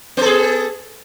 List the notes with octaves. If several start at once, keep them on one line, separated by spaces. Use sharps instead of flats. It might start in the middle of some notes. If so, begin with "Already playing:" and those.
B3 G#4 A4